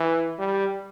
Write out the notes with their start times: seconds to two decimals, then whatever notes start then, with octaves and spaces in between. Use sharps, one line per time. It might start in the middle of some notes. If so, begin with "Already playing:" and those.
Already playing: E3
0.39 G3